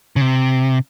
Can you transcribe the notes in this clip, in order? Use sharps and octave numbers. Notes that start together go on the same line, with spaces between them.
C#3
C3